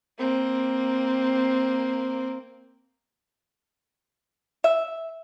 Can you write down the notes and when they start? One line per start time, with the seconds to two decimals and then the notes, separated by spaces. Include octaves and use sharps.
0.18 A#3 C4
4.64 E5